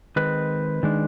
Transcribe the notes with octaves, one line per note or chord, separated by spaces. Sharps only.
D#3 G#3 C4 B4
D#3 G#3 D4